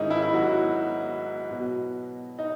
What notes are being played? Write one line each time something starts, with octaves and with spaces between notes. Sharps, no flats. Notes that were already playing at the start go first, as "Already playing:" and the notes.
Already playing: G#2 D#3 G#3 C#4 D#4 E4
E4
E4
F#3 F#4
B2 F#3 B3
D#4